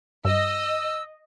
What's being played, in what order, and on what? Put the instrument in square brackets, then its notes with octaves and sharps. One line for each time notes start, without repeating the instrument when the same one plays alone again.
[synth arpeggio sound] G2 [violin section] D#5 [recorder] E6